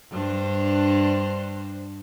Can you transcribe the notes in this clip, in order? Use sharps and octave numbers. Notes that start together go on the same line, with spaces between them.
G2 D4 C5